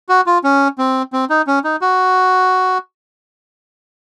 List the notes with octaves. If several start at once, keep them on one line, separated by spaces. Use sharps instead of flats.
F#4
F4
C#4
C4
C4
D#4
C#4
D#4
F#4